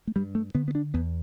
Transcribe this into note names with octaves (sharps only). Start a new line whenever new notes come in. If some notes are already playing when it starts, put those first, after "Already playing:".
A3
G2 G3
A3
D3 B3
B3
D4
E2 B3